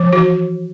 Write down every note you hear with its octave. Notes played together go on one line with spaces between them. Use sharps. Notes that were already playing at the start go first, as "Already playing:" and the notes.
Already playing: F3
E3 F#4